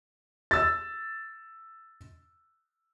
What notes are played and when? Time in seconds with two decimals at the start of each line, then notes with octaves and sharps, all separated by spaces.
0.51 E6 A6